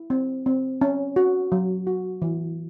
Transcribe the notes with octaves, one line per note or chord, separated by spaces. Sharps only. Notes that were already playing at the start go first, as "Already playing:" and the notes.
Already playing: E4
C4
C4
C#4
F#4
F#3
F#4
E3